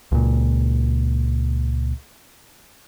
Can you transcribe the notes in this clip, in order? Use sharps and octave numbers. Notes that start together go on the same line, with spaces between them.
C#2 A#2